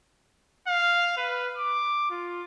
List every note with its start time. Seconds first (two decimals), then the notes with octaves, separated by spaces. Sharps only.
0.68 F5
1.17 B4
1.57 D6
2.11 F4